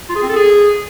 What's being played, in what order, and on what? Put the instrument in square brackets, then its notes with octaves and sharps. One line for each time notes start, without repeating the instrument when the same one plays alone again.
[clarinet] F4
G#4
C4
A4
G#4